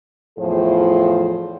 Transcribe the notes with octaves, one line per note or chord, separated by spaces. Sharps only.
E2 A2 F3 F4 G#4 C5